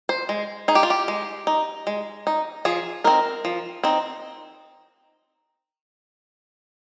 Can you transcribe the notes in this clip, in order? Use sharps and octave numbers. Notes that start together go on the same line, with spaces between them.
C5
G#3
D#4 G#4
G4
F4
G4
G#3
D#4
G#3
D#4
F3 G#4
C4 D#4 A#4
F3
C4 D#4